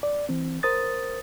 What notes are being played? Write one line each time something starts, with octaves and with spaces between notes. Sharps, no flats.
D5
E3 C4
A#4 C5 D#6 A6